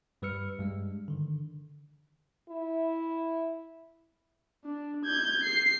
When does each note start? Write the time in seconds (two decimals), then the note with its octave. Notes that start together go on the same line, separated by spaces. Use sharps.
0.22 G2 G3 B4 E6 F6 C#7
0.59 G2 G3 G#3
1.08 D3 D#3
2.49 E4
4.65 D4
5.05 G6 G#6
5.44 C7